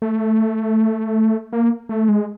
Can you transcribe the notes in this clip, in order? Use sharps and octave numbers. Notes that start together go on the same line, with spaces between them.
A3
A#3
A3
G#3